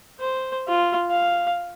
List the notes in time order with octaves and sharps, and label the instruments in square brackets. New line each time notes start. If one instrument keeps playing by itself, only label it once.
[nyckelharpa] C5
F4
F5